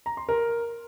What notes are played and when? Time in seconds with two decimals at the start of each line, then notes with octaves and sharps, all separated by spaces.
0.06 A#5
0.17 C6
0.29 A#4